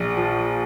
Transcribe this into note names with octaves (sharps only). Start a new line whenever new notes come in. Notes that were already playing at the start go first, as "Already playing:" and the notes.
Already playing: A#1
F3